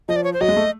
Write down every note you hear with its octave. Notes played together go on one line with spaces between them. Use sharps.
F3 D#5
D5
C#5
C5
F#3 D#5
G#3
A3